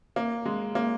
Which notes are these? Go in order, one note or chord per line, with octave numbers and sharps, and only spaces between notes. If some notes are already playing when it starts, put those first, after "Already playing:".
A#3
G#3
A#3